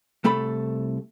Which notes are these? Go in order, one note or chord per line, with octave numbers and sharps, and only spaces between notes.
C2 A3 A4 B5